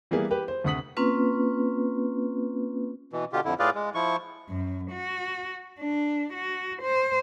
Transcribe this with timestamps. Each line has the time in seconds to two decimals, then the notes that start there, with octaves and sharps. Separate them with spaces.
0.11 E3 G3 A#3 B3 E4 G#4
0.31 G4 B4
0.48 C5
0.64 D2 C3 F#5 D#6 B6 F#7
0.97 A#3 C4 C#4 F4 B4
3.13 B2 E3
3.33 B2 D3 F4 G4
3.45 F2 D3 E4
3.59 A2 F4 G#4 B4 D5 F5
3.75 G#3
3.95 F3 E4 C#6
4.49 F#2
4.91 F#4
5.79 D4
6.34 F#4
6.82 C5